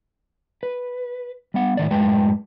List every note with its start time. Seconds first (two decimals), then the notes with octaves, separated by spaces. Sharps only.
0.63 B4
1.54 G3 B3 F#5
1.77 A2 D#3 D5
1.91 F#2 A2 G#3 B4 G5 A5